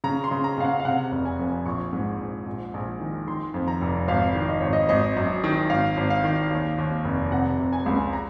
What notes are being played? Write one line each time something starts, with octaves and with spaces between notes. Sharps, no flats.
C#3 A#5
C6
C#3
A#5
C#3 F5
F#5
F5
C3 F#5
F1
G#5
F2
A#1 C#6
G#2
A#1
A#1
A#1
D#3
D#3 C6
F2
A#5
F1
G#1 F5
D#3
D#5
G#1 C#5
D#5
G#1 D#5
F#2
D#3
G#1 F5
G#1
F5
D#3
D#2
D#2
F1
C3 F#5
C3
G#5
C#2
A#5